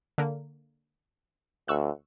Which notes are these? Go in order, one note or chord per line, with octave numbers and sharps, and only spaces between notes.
D3 A#3
D2 C#6 E6 F#6